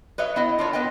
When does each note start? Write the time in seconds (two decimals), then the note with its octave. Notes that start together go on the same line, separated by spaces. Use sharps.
0.18 B4 C#5 D#5 E5
0.36 B3 E4 D#5
0.59 D4 F4 C#5
0.73 B3 B4 D#5 G5